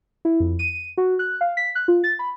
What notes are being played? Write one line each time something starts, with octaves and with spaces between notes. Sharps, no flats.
E4
F2
D#7
F#4
F#6
F5
B6
F#6
F4
A6
B5